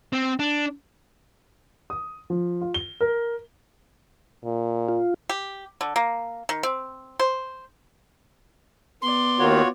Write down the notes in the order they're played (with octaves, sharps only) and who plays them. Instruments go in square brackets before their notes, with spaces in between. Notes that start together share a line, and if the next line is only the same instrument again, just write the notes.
[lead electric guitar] C4
D4
[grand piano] D#6
F3
F4
G7
A#4
[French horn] A#2
[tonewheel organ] F4
[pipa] G4
D3
A#3
D#3
C4
C5
[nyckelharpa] B3 D5 [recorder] C6
[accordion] D#2 D#3 [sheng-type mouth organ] F4 F#4 C#5